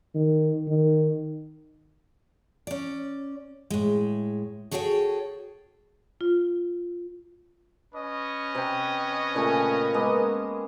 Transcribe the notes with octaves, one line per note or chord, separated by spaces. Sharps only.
D#3
D#3
C#4 D5
A2 G#3
F#4 G#4 A4 C#5 F#5 G5
F4
C#4 B4 D#5
C3 G5
A#2 C#3 A3
G#3 A#3 B3